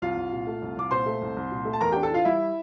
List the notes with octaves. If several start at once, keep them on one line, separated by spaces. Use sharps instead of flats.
C2 F4 F5
C2
A#2
A3
C2
C2 D6
A#2 C5 C6
A3
C2
C2
A#2
A3
A5
E2 A#4 A#5
D4 G4 G5
A4 A5
E3 F4 F5
G3 E4 E5